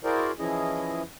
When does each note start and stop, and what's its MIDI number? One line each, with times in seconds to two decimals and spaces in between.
0.04 0.31 64
0.04 0.31 66
0.04 0.31 68
0.04 0.31 70
0.04 0.31 72
0.04 0.31 74
0.39 1.02 52
0.39 1.02 53
0.39 1.02 61
0.39 1.02 64
0.39 1.02 68
0.39 1.02 75